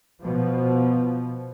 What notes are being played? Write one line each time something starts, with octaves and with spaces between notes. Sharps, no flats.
B2 F3